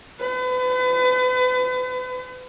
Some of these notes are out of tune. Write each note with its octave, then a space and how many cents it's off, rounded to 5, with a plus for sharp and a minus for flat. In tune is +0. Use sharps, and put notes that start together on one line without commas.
B4 +40